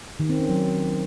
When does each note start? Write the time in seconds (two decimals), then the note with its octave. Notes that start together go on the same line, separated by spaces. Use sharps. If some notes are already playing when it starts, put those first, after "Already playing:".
0.20 D#3
0.29 C4
0.39 C#4
0.49 F#3